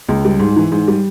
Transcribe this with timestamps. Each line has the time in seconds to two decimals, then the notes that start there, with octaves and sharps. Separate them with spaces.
0.09 C#2
0.25 G3
0.39 G#2
0.56 E3
0.72 G#2
0.88 G3